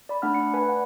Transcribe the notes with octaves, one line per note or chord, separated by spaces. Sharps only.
D5 B5
A3 D4 F#5 B5 F6
D5 C#7
B4 G#5 B5
F#5